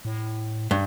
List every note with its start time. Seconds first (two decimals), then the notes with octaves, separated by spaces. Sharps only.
0.05 A2
0.71 G2